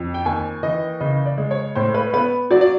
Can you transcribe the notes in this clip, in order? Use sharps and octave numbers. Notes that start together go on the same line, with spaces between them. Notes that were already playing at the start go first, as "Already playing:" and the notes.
Already playing: F2
G5
D#2 G#5
E3 D#5
C#3 D#5
D5
G#3
C#5
A2 C5
B4
B3 B4
F#3 D5
D5